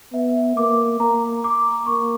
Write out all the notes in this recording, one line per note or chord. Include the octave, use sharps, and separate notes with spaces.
B3 E5
A#3 D6
A#3 A#5
D6
A#3 C#6